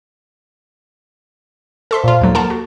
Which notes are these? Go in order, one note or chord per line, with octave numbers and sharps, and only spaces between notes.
A4 C5 E5 A5 C6 B6
A#2 F4
D#2 F#3 A#3 A4
A#4 F#5 A5 C6
F#4